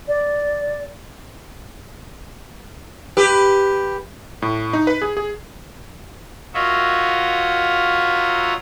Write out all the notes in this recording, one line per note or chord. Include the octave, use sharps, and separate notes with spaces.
D5
G4 B4
A2
D#4
B4
G#4
G#4
F4 F#4 A#4 C#5 D#5 E5